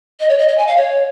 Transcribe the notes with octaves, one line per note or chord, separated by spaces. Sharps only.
D#5
C#5
D#5
D#5
G#5
F5
C#5